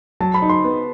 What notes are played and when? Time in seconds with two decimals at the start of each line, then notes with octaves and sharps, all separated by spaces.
0.20 F#3 A5
0.34 B5
0.42 D#4
0.50 C6
0.64 B3